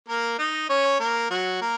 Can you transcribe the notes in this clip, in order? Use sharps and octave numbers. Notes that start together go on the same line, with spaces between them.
A#3 A#4
D#4 D#5
C#4 C#5
A#3 A#4
F#3 F#4
A#3 A#4